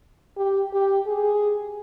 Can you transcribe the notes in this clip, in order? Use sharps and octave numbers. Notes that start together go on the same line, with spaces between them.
G4
G4
G#4